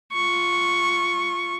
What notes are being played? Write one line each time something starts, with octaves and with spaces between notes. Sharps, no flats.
F4 C#6